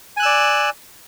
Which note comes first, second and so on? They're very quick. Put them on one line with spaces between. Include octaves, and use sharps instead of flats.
G#5 F#6 E6 D5